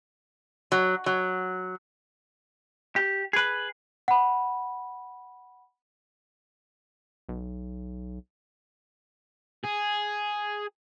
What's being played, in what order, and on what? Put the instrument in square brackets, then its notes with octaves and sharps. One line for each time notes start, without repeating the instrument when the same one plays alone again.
[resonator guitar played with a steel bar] F#3
F#3
[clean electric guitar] G4
G#4 B4
[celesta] F#5 B5
[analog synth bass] B1
[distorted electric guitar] G#4